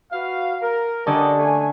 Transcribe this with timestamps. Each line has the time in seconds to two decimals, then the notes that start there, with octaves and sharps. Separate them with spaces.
0.12 F#4 B4 F5
0.61 A#4
1.06 D3 C#4 D4 G4 D5 D#5
1.39 A3 G#5